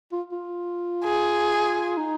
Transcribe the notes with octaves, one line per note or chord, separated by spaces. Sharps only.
F4
F4
G#4
D#4